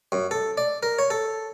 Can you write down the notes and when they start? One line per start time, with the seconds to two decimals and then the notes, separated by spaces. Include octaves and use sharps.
0.12 F#2
0.31 A4
0.57 D5
0.83 A#4
0.99 C#5
1.10 A4